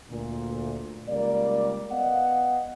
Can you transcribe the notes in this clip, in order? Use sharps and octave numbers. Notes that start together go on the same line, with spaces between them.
D2 A#2
C#2 G3 A#3 A#4 D5
B3 D#5 F5 F#5